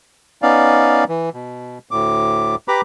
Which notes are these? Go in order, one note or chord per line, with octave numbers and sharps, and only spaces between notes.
B3 C#4 D#4 D5 F5
E3
B2
D2 A2 D6
G4 B4 A#5 B5 D6